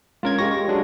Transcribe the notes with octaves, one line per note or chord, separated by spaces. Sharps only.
G#3 C#4 F4 A#4 G#6
G#3 G4 C#6 A#6
F#3 G#3 D4